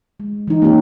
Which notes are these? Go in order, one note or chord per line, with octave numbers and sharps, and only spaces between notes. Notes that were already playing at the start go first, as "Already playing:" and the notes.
G#3
E3 D#4
A#3 C4 C#4 G4